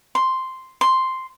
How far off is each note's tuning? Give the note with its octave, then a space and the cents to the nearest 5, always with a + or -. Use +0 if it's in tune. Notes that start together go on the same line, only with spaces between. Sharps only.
C6 -5
C6 +0